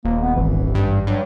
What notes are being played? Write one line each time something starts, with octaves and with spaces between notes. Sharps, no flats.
D#1 A#3
B3
G#1 E3
G2
G2 F#3